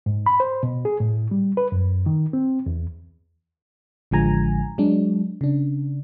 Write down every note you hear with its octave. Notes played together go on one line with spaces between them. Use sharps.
G#2
B5
C5
B2
G#4
A2
G3
B4
F#2
D#3
C4
E2
A1 D3 F3 G#3 G#5 A#5
F#3 G#3 D4
C#3 D4